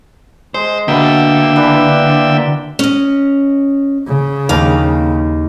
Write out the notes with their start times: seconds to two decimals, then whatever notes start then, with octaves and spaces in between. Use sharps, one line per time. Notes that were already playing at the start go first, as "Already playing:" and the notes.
0.54 G#3 C5
0.88 B2 D3 A#3 E5 G5 B5
1.56 E3 D4
2.79 C#4 D#5
4.08 C#3
4.49 D#2 A#4 F5